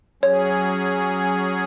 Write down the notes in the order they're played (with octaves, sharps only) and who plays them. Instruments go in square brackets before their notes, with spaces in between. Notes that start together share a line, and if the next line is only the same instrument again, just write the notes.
[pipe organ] F#3 C#4 G#4 [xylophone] C#5